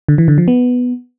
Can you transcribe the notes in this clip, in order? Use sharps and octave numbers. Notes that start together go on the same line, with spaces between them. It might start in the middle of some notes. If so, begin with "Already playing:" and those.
D3
E3
D3
F3
B3